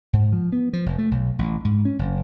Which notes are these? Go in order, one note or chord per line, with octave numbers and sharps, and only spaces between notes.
G#2
F3
B3
F3
F1
A3
B1
A1
G#2
C#4
F#1